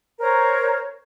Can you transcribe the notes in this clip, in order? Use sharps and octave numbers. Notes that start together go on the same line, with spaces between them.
A#4 C5 C#5 A#5